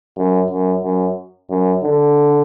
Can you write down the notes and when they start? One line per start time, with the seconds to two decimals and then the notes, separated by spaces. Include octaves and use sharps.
0.18 F#2
0.51 F#2
0.84 F#2
1.50 F#2
1.83 D3